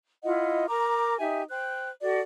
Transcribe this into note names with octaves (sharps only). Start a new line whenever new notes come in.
E4 F4 D#5 F#5
A#4 A#5 D6
D#4 G4 E5 G#5
C5 G5 F#6
F#4 A4 D5